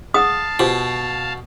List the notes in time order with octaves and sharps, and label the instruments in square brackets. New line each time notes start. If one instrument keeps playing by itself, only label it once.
[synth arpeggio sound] G#4 F#5 [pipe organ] F5 A5 [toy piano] D#6
[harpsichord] B2 [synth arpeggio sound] F4 G4 C5